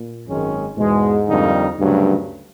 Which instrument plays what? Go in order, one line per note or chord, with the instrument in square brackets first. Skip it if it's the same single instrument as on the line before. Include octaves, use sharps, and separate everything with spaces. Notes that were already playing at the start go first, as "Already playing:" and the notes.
Already playing: [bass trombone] A#2
[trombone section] G#1 F#2 D#3 G#3 C#4
[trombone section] E2 B2 G#3 [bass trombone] G#2
[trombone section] F2 D3 G3 A#3 D#4
[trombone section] D2 C#3 F#3 [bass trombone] G2